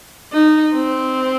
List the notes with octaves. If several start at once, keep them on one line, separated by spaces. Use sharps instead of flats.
D#4
C4